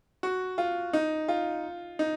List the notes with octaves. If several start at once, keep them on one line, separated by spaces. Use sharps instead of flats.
F#4
F4
D#4
F4
D#4